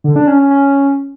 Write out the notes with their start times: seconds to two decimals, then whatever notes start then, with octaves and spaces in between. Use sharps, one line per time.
0.04 D3
0.16 D4
0.27 C#4
0.39 C#4
0.51 C#4